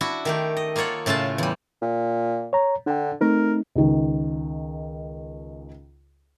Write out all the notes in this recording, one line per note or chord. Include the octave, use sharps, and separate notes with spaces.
D4 E4 F#4
D#3 A3 G4
D#5
A#3 F4 A4 C#5 F#5
A2 C#3 A3 F4 A5
E2 G3
A#2
C#5 A#5
D3 D4 G5
A3 C4 D#4 A#4
C#2 D#3